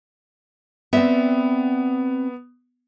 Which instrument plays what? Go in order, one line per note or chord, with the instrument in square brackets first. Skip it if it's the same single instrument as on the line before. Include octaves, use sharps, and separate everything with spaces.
[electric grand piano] B3 [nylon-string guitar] C4 D5 E5